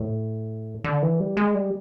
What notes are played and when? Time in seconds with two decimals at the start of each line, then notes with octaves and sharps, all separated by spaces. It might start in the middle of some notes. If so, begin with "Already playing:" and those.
Already playing: A2
0.84 D3
1.02 E3
1.20 G3
1.37 G#3
1.55 G3